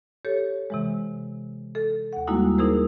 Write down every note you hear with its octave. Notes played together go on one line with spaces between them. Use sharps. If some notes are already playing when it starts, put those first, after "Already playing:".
G4 A4 C#5
C3 E3 G#3
A4
D#2 F#5
G3 G#3 A#3 D#4 E4 F#4
D#4 E4 G#4 A#4 C5